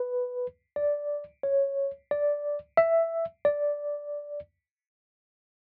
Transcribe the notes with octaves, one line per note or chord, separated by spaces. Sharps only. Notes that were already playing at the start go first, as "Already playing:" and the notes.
Already playing: B4
D5
C#5
D5
E5
D5